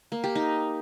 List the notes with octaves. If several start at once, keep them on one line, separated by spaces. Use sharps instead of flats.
A#3
G4
D#4